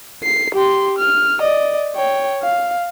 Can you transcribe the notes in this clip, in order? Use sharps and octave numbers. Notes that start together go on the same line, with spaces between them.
C7
G4 C6
F6
D5 D#5
C#5 G5
F5